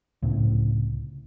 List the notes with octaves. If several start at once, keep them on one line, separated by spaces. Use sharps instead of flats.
C#2 A2 C3